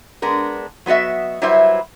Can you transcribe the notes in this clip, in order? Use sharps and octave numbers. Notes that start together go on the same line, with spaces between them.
G#3 B3 D4 A#4
F#3 B3 F#4 D#5 E5
F#3 G3 E4 B4 C5 E5